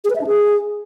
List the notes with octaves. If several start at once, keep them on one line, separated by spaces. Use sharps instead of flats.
G#4
B4
E5
D4
G#4